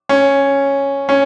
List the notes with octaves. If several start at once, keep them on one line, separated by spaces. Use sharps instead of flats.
C#4
C#4